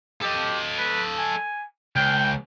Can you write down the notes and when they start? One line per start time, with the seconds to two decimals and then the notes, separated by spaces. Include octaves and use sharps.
0.22 G4 A4 D#5
0.78 B4
1.18 G#5
1.96 C#2 G5